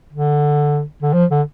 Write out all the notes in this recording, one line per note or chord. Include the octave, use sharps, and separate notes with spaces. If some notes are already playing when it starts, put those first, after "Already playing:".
D3
D3
F3
D3